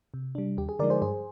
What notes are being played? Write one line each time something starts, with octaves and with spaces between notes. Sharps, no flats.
C3
G3 D4
D#2 G4
G#4
D3 F3 G#3 D#4 A#4 D5
G#4 C5
G2 G#4 C5